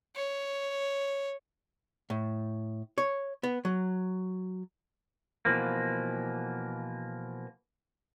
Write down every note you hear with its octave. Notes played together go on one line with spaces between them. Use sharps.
C#5
A2
C#5
B3
F#3
B2 E3 F3 A#3